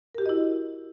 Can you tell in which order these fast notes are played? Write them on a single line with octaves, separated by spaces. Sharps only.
A#4 G4 F#4 D#5 E4